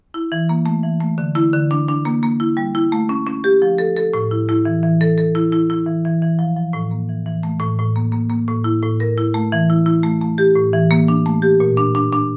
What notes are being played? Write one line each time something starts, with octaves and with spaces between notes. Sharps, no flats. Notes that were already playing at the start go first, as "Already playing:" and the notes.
E4
E3
A#3
A3
E3
A3
D3
E4
D3
D4
D4
A#3
A#3
E4
G3
E4
A3
C#4
C#4
G4
F3
A4
A4
A2
E4
E4
E3
E3
A4
A4
E4
E4
E4
E3
E3
E3
F3
F3
A2
A#3
E3
E3
A3
A2
A2
A#3
A#3
A#3
A2
E4
A2
A#4
E4
A3
E3
E4
E4
A3
A3
G4
A2
E3
A#3
D4
A3
G4
A#2
D4
D4
D4